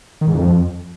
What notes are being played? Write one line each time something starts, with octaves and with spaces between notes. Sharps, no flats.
D#3
G#2
F2